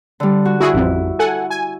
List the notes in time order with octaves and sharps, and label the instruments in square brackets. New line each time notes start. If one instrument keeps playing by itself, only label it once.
[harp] D3 G3
F#4
[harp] E4 [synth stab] F#4 G#4
[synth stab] A1 F2
A4 F#5 G#5
G#5